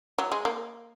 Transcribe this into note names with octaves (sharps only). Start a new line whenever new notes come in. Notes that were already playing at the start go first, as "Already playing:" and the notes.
F#3
G#3
A#3